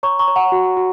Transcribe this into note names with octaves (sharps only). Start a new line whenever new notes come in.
C#5 A#5 C#6
A#5 C#6
C#5
F#5 A#5
F#4
F#4